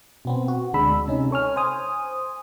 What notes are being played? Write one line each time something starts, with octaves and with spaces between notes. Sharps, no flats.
B2 B3 C4
F#4
D2 G#3 D4 B5 E6
C3 C#4 D#4
A4 C#5 G#5 F6
C5 G#5 D#6